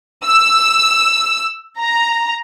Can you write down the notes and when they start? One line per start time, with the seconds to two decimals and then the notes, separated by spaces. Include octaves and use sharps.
0.25 E6
1.80 A#5